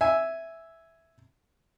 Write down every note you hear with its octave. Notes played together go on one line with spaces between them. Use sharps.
E5 G#5